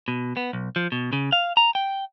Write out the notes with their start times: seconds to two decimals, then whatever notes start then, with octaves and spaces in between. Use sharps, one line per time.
0.08 B2
0.37 B3
0.53 B1
0.76 F3
0.92 B2
1.13 C#3
1.32 F5
1.57 A#5
1.75 G5